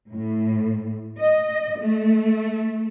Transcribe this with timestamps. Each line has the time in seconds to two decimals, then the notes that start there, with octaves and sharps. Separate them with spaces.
0.12 A2
1.20 D#5
1.80 A3